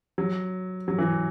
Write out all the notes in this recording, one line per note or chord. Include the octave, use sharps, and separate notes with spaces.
F#3
F#3
E3